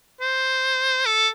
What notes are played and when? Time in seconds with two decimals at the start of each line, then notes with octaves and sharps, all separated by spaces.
0.21 C5
1.06 A4